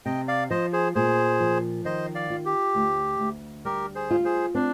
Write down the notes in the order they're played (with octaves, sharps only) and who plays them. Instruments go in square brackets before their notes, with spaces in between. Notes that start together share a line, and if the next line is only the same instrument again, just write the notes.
[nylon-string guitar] C3 [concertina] D#5 G5
[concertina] D5 F5
[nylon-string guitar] F3 [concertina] C5 D#5
[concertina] G#4 C5
[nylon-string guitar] A#2 [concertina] G#4 C5
[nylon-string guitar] F3
[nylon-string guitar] D#3 [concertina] C5 D#5
[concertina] D5 F5
[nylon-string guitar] F4
[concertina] G4
[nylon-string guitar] D2
D2
[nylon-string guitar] G3 [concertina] G4 A#4
[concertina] G#4 C5
[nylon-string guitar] F4
[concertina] G#4 C5
[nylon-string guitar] C4 [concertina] D4